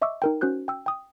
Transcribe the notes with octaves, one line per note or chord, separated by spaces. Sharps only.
D#5 E5 C#6 D6 E6
D#4 A#4 G5
C#4 F#4 C5 F#6 G6
G5 E6
G5 D#6